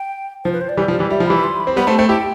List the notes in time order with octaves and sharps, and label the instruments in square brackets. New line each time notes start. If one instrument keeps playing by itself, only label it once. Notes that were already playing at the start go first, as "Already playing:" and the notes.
Already playing: [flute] G5
[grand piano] F3 [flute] C5
[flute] B4
C5
D5
[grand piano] E3 G3
F3
E3 G3
[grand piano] G3 [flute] E5
[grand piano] F3
[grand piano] E3 G3 [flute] B5
[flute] C6
B5
[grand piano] C4
[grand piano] G3 B3 [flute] B5
[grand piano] A3 C4 [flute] A5
[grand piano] A3 C4 [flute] G5
[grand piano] E4 G4 [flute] G5